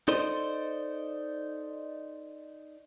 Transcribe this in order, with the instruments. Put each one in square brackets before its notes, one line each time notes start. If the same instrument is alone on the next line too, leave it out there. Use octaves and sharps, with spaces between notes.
[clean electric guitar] D#4 A4 C5 D5 D#5